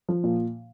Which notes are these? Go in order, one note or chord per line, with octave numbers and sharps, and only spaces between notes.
F3
A#2